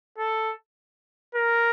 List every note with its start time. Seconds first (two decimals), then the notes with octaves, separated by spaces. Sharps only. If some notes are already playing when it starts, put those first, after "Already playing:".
0.18 A4
1.35 A#4